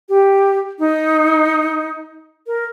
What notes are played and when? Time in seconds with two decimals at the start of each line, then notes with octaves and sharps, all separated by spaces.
0.09 G4
0.79 D#4
2.47 A#4